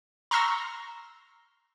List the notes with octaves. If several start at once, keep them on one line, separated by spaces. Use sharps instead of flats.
A#5 C6 C#6 E6 F6 A#6